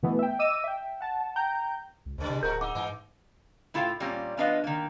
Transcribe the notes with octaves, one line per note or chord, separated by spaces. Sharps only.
B2 E3 A3 B3
E5 G5
D#5 D6 E6 D#7
E5 G5
F#5 A5
G5 A#5 G6
C#2
D2 G#2 C#3 G3
C3
D1 A#2 F#4 A#4 A#5 G6
D#4 F#5 G#5 D6 E6
G#2 E3 D#4
A2 E4 F4 A4 F5 G5
A#2 G3 A#3 C4 C#4 F4
F3 B3 D4 B4 D#5 F5
D#3 A#3